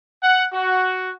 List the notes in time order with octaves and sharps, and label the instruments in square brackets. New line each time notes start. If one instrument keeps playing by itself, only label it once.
[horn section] F#5
F#4